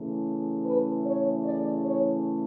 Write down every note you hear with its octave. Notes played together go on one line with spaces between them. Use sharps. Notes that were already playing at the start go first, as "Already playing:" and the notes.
Already playing: C#3 E3 A3
B4
C#5
D5
C#5